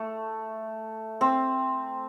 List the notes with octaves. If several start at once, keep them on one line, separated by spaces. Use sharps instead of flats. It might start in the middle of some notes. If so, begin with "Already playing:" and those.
Already playing: A3
C4